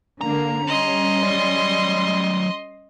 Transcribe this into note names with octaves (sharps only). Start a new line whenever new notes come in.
D3 A#3 A#5
G3 C#4 D#5 C6
F#3 D5